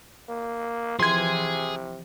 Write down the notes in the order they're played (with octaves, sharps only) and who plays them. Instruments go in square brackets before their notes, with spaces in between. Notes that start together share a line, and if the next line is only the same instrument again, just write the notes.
[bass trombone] A#3
[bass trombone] C3 [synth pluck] E3 F3 [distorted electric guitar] G#4 [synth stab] C6 G#6